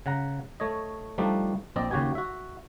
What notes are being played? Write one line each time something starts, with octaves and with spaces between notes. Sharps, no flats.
C#3 F#5 A#5
A3 C#5 D#5
F3 G3 A3 D4 D#4
A#1 C4 D5 D#5
D#2 C#3 F#4 G4 G#5
F#4 E5